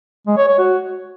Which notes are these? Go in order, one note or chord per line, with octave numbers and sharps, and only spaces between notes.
G#3
C#5
C#5
F#4